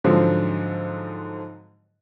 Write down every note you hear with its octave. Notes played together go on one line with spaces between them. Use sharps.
G#2 D3 F3 F#3 C4